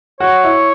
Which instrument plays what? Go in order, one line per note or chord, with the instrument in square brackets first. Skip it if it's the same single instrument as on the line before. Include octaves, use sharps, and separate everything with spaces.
[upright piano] F#4 [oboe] C#5
[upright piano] E4